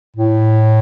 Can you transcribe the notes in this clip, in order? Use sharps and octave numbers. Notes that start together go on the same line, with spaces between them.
A2